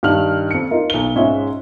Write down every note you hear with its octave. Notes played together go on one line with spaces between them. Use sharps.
G2 D#3 F6 F#7
F2 C#7
D#4 F4 A#4
B1 G7
G#2 G#3 C#4 F4 E5